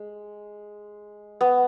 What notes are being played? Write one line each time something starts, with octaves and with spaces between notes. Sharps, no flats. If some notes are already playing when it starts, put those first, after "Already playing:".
Already playing: G#3
B3